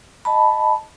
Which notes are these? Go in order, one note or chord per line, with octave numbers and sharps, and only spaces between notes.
D#5 A5 B5